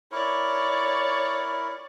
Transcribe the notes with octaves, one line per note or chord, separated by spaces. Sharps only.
E4 A#4 C#5 D5